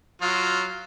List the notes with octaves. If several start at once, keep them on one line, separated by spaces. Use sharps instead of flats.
F#3 F4